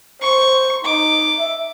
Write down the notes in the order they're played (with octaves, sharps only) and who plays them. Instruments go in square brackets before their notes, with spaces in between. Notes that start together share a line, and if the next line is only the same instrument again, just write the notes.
[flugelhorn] C5 [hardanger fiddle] C#6
[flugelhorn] D#4 [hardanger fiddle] D6
[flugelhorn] E5